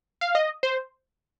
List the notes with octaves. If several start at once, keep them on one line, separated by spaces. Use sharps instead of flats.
F5
D#5
C5